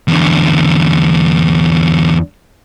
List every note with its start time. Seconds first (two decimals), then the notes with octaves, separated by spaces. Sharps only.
0.08 E2 D3